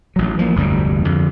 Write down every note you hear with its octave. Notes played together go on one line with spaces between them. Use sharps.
A1 F#3
E3 F3 G3 A#3
F1 D2 G2 G3
F2 D3